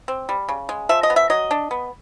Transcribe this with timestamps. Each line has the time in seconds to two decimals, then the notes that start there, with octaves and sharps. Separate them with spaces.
0.08 C4
0.29 G3
0.49 C#3
0.69 G#3
0.89 F3 E5
1.03 D#5
1.10 B3
1.16 E5
1.30 F#3 D#5
1.51 D4
1.71 B3